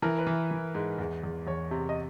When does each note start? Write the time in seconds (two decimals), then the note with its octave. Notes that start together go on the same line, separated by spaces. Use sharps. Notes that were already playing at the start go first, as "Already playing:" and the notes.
0.02 E3 A#4
0.18 B4
0.27 E3
0.51 E3
0.75 G#2
0.98 E2
1.23 E2
1.47 E2 C#5
1.71 C3
1.89 D#5